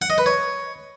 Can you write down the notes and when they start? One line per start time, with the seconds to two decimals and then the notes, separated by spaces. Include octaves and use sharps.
0.02 F#5
0.10 D#5
0.18 B4
0.26 C#5